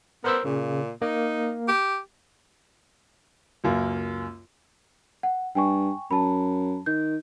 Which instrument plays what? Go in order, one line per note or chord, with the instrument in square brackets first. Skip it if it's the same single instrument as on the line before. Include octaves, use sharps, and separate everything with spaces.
[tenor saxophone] B3 [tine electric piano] A#4 C5 E6
[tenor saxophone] A#2 [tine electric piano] C#3
[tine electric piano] A#3 [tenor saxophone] D#4
[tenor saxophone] G4
[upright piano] C#2 F#2 A#3
[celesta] F#5
[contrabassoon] G2 [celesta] G5 G#5 C#6
[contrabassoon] F#2 [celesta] A5 B5
[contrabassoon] D#3 [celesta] G6